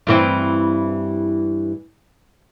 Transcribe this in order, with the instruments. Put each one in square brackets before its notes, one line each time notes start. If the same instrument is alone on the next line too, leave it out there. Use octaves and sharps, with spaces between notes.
[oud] G2 E3 C4